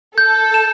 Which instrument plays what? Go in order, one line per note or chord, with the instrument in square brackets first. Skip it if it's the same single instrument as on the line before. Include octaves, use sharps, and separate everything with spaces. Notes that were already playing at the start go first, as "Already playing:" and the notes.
[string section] A4 [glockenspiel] G6
[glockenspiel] E7